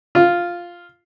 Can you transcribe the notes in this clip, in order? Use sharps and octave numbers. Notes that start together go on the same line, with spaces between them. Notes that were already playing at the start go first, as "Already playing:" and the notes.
F4